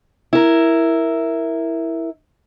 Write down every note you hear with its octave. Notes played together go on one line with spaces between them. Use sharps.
E4 A#4